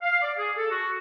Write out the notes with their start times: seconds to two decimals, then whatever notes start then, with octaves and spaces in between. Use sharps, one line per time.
0.02 F5
0.22 D5
0.37 G#4
0.57 A4
0.71 F#4